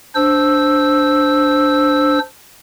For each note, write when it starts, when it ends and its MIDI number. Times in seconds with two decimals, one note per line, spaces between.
0.15 2.19 62
0.15 2.19 72
0.15 2.19 88